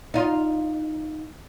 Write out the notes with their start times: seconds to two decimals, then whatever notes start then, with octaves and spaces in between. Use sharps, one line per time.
0.14 D#4 F4